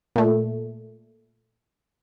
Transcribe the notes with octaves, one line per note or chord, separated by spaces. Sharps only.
A#2 A3